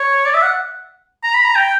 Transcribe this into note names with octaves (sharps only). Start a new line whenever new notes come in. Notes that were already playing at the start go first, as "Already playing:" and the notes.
Already playing: C#5
D5
E5
F#5
A#5
B5
A#5
G5